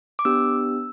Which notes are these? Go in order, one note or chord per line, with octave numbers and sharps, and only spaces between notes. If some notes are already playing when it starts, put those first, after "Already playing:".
D6
B3 D4 G4 E6